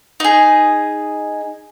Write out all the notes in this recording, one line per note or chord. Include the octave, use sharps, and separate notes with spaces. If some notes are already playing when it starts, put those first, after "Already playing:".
D#4 G#4